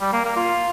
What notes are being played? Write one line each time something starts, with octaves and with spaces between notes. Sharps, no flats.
G3
A#3
A#3
F4